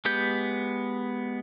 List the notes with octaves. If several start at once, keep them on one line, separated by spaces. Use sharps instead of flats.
G#3 B3 G4 G6